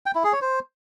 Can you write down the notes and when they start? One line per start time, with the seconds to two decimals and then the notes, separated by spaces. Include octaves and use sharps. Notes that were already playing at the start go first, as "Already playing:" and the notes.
0.06 G5
0.15 E4
0.24 G#4
0.33 C#5
0.42 C5